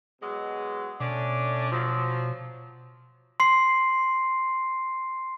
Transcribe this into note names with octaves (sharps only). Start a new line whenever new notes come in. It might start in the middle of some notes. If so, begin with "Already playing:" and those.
B2 F#3 G#3
B2 A3 C#4 D4
F3 F#3
C6 C7